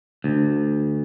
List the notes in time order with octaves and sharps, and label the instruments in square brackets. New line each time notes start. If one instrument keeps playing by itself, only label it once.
[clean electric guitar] D2